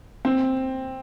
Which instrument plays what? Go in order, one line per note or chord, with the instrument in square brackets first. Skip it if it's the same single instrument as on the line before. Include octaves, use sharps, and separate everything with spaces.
[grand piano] C4